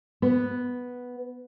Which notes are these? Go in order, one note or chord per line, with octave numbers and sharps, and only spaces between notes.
B3